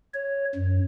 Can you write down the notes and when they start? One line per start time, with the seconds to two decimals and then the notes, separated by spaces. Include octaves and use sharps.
0.14 C#5
0.55 F#2